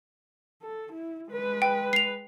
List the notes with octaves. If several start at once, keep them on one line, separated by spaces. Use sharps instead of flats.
A4
E4
G#3 B4
G5
C7 F7